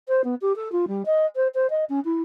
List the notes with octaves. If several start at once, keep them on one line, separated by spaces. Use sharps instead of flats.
C5
B3
G4
A4
F4
G3
D#5
C5
C5
D#5
C#4
E4